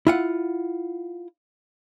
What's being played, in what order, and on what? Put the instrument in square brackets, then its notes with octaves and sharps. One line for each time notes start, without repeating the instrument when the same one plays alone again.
[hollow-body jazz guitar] E4 F4 F#5